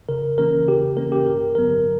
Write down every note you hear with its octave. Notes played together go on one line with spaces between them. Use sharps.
C#3 A#4
E3 A#3 C#4 A#4
C#3 G4
E3 A#3 C#4 A#4
G4
G2 A#4
D3 F#3 B3 A#4